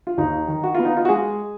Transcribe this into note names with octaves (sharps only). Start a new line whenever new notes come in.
F4
D#2 D#4
D#3
F#4
B3 F4
D#4
F4
F#4
G#3 G#4